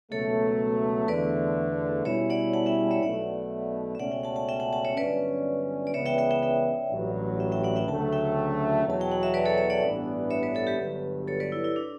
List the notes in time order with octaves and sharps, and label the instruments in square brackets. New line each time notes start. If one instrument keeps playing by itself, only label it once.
[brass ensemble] C#2 B2 F#3 A3 [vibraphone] A4 C#5
[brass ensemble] E2 D3 A3 [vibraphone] B4 D5
[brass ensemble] B2 G3 C#4 E4 [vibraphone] C#5 E5
[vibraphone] D5 F#5
F#5 A5
E5 G5
C#5 E5
[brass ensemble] B1 B2 A3 [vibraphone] D5 F#5
[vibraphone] E5
[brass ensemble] C#2 B2 A3 C#4 [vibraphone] D5 F#5
[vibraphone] E5 G5
F#5 A5
F#5 A5
E5 G5
F#5 A5
F#5 A5
C#5 E5
[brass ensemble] G1 G2 F#3 C#4 [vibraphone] B4 D5
[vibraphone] D5
[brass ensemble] C#2 C#3 E3 B3 [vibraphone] C#5 E5
[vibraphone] E5 G5
E5 G5
E5 G5
E5 G5
[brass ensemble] A1 G2 F#3
[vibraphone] E5 G5
E5 G5
D5 F#5
E5 G5
[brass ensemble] D2 C#3 F#3 A3 [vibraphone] F#5 A5
[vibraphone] E5 G5
[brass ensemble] E2 B2 F#3 [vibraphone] A5
[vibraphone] G5
F#5
E5
B4 D5
A4 C#5
C#5 E5
D5 F#5
[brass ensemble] A1 G2 E3 B3 D4
[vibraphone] C#5 E5
B4 D5
A4 C#5
G4 B4
[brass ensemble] G1 G2 F#3
[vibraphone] A4 C#5
B4 D5
E4
E4
D4